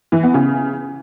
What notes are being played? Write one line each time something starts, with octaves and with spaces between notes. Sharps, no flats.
E3
B3
C#3